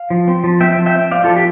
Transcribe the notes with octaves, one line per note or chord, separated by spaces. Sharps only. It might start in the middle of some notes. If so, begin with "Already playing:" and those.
Already playing: F5
F3
C4
F3
C4 E5 G5
F3
E5 G5
C4
C4 D5 F5
F3 F4 A4
G4